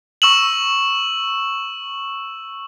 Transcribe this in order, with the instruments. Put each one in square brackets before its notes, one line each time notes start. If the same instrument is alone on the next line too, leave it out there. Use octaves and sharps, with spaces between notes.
[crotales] C#6 E6 E7 F#7